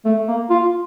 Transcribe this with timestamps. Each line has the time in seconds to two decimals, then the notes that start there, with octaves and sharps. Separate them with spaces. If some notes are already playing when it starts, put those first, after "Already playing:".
0.05 A3
0.28 A#3
0.50 F4